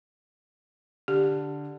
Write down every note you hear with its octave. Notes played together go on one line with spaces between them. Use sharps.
D3 G4